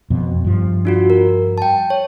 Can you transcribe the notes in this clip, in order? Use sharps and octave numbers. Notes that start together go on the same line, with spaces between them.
F2 B2
G2 F3
D4 F4 F#4
A#4
G5 A5
C#5